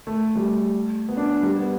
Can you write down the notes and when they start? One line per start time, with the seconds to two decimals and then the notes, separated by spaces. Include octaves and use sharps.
0.07 A3
0.35 G3
0.40 A3
1.09 B3
1.17 D4
1.42 G3
1.59 B3